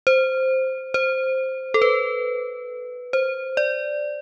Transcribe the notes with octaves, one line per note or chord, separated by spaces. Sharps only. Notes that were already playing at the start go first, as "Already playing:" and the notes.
C5
C5
A4
B4
C5
D5